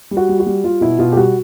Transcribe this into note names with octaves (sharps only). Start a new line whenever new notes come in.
G3
F#4
G3
F#4
G3
G3 F4
B2 E4
B2 F4
G4
G3 F#4